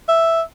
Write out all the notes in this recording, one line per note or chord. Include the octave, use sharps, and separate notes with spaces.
E5